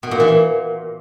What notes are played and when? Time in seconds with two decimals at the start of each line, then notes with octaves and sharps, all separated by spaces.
0.03 B2
0.11 A#2
0.20 E3
0.28 A#2